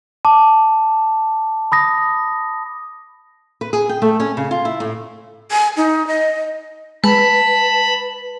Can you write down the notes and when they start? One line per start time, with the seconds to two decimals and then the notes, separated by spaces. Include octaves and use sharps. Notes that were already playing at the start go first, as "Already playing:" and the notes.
0.25 A5 D6
1.72 B5 D#6 A#6
3.61 B4
3.73 G#4
3.89 G5
4.02 A3
4.20 C#4
4.37 C#3
4.51 F4
4.65 E4
4.80 A2
5.51 G#5
5.77 D#4
6.07 D#5
7.04 G#3 B4 A5 B5